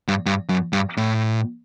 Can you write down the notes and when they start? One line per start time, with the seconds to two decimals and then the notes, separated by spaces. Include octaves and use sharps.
0.08 G2
0.26 G2
0.49 F#2
0.73 G2
0.97 A2